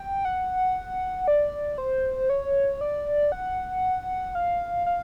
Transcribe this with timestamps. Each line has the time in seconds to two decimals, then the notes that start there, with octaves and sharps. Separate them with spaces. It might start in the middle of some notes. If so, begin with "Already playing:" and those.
Already playing: G5
0.25 F#5
1.28 D5
1.78 C5
2.30 C#5
2.81 D5
3.32 F#5
4.35 F5
4.86 F5